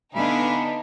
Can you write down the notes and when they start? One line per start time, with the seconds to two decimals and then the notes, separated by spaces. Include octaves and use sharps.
0.15 D3 B3 D4 D#4 E5 F5 G#5 B5